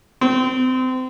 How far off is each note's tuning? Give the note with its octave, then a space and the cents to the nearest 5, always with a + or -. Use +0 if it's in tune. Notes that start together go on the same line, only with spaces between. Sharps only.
C4 -30